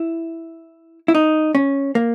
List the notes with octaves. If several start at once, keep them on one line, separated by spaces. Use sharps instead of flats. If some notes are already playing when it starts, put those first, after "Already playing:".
Already playing: E4
E4
D#4
C#4
A#3